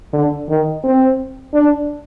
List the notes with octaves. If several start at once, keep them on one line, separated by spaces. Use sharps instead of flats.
D3
D#3
C4
D4